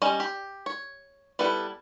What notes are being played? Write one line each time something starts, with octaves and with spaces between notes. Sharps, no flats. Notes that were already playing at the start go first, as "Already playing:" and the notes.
G3 C#4 D#5
G4
C#5
G3 B3 E4 A4 B4